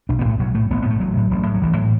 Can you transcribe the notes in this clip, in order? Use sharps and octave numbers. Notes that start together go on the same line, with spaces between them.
B1 D4
B3
A2 A3
B1 F#3
A2 A3
A1 B3
B3
A2
A3
A1 F#3
A2
A1
A2
F#3
A1 E3
A2 F#3